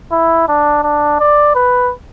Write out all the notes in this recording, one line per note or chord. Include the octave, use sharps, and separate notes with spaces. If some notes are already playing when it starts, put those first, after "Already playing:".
E4
D4
D4
D5
B4